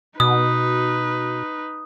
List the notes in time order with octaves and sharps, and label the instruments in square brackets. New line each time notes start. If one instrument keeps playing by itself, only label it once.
[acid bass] B2 [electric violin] D#4 B4 [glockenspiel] D#6